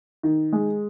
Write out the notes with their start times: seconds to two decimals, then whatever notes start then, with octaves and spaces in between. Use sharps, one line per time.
0.23 D#3
0.53 G#3